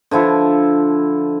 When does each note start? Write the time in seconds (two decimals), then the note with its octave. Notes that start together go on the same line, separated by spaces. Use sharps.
0.11 D3 F3 E4 A4